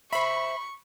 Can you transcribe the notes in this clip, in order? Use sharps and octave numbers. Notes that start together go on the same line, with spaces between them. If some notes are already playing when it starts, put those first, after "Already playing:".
C5 E5 B5 C#6